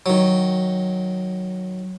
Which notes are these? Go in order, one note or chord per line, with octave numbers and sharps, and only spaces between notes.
D#3 F#3